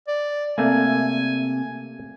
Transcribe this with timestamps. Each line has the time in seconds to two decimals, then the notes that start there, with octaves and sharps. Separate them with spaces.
0.08 D5
0.58 C3 A3 A#3 G#5